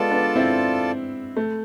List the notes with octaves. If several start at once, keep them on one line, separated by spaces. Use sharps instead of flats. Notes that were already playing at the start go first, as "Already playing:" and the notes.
Already playing: G#3 B3 F4 A4 D5 A5
B3 D4
C4 E4
A3